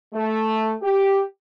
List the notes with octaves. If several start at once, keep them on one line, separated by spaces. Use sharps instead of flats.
A3
G4